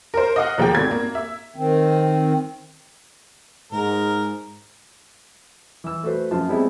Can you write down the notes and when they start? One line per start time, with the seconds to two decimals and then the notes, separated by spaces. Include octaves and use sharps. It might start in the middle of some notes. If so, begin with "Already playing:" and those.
0.14 A#4 C5
0.36 D#5 F5 F#5
0.58 D#2 F3 G#4 G5
0.75 G#1 A2 G#6
0.91 A#3
1.15 E5
1.56 D#3 C4
3.72 G#2 A#4
5.84 E3 E6
6.03 A3 F#4 A4 B4 C5
6.31 F#2 F3 F4 A5
6.48 G3 G#3 B3 C4 E4 G#4